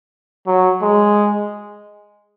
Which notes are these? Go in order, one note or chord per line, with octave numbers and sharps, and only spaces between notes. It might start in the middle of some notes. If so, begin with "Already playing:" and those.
F#3
G#3